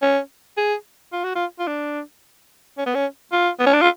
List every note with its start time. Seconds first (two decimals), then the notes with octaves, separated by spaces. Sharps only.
0.02 C#4
0.57 G#4
1.13 F4
1.24 F#4
1.35 F4
1.59 F4
1.67 D4
2.78 C#4
2.86 B3
2.95 C#4
3.32 F4
3.59 B3
3.66 C#4
3.74 D4
3.81 F4